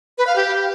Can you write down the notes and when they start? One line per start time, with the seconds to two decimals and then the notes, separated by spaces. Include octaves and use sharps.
0.18 B4
0.27 F5
0.36 G4